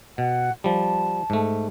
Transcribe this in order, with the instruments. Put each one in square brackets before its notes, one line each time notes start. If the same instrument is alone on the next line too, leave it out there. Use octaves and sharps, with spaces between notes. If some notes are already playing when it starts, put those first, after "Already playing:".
[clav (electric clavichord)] B2 [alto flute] F#5
[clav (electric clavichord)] F3 G3 [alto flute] A5
[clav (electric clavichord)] G#2 A3